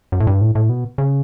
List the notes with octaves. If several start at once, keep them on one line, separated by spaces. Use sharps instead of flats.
F#2
A2
G2
A2
A2
B2
C#3